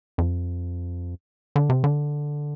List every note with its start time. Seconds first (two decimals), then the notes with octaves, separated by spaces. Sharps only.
0.18 F2
1.56 D3
1.69 C3
1.84 D3